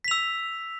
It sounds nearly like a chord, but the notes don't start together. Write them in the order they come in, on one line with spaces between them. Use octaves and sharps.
B6 F7 E6